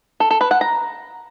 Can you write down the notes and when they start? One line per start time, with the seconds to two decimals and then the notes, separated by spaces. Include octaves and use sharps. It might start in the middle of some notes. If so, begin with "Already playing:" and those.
0.20 A4
0.30 A4
0.41 B4
0.51 F#5
0.61 A#5